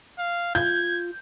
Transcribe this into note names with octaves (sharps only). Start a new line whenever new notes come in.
F5
F4 G6 G#6